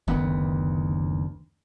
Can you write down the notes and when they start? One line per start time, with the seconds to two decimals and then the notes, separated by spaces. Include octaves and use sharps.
0.08 F#1 D2 D#3 B3